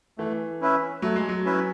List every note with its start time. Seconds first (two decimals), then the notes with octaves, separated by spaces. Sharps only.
0.18 E3 A3
0.61 C#4 E4 B4 E5
1.02 F#3 A3
1.16 G#3
1.29 F#3
1.45 C#4 E4 B4 E5